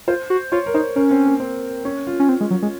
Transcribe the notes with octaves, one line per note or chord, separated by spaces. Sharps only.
F4 C5
F#4
F4 C#5
A#4
D#4 C5
C#4 A#4
C4
A#3
C4
C#4
F4
C#4
C4
G#3
F#3
G#3